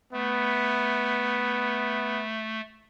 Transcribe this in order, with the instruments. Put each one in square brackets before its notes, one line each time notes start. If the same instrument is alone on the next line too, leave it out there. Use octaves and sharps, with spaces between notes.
[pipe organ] A3 [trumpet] B3